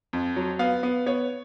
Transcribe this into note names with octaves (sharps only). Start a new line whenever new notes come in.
F2
F#3
B3 F5
B3
B3 C#5